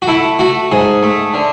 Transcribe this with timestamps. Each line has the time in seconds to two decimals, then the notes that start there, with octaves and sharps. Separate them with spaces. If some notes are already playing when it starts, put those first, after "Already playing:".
0.02 F#4
0.07 A3 E4
0.39 A3 F#4
0.72 G#2 G#4
1.03 A3
1.34 D3